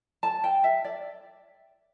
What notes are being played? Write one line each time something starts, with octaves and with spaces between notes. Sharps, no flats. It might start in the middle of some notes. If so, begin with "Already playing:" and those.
A5
G5
E5
D5